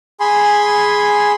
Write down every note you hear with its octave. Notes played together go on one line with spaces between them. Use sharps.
G#4 G#5 B5 C6